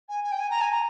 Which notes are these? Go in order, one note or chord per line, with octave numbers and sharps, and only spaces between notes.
G#5
G#5
G5
G#5
A#5
G#5
A#5